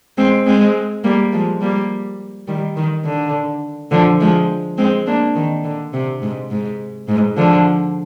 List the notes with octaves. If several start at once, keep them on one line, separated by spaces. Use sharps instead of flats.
G#3 C4
G#3 C4
G3 A#3
F3 G#3
G3 A#3
D#3 G3
D#3
D3
D3 F3
F3 G#3
G#3 C4
A#3 D4
D#3
D3
C3
G#2
G#2
G#2
D3 F3